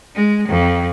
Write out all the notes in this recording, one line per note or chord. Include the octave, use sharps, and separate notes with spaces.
G#3
F2